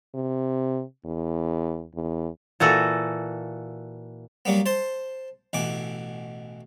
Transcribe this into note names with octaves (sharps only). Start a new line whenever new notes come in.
C3
E2
E2
A#2 E3 F#4 A4
F#3 G3 A#3 B3
C5 A5 C6
A1 B2 E3 D6